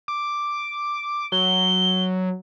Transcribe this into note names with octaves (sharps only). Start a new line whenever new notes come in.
D6
F#3 G7